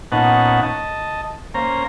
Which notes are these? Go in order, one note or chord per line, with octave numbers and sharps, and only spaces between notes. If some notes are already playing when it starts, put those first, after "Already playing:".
A#2 B3 C#4 D#4 F#5 A5
D#5 A5
A#3 C#4 C5 A#5